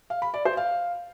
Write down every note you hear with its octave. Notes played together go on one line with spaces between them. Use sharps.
F5
B5
D5
C5
F5